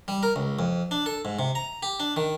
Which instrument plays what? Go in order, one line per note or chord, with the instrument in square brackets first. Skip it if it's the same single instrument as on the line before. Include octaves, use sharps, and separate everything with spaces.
[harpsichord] G3
A#4
C#2
F2
D4
A4
G#2
C3
A#5
G4
D4
D#3